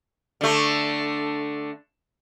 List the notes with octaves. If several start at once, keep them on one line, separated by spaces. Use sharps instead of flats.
D3 A3